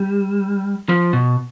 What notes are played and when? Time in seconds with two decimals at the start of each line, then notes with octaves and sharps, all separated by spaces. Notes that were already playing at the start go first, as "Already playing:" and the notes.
Already playing: G3
0.89 F3
1.13 B2